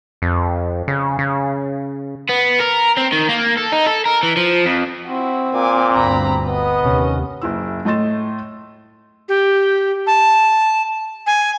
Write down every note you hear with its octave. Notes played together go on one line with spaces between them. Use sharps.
F2
C#3
C#3
B3
A#4
C4
D#3
A#3
A4
D#4
A4
A#4
E3
F3
F2
C4 E4 F#4
A#2 G#5 D6
G1 D2 A#5 B5
B3 D#5
D#2 C3 C#4
F#1 E4 E6
A2 A3 D#5 C6 A6 E7
G4
A5
G#5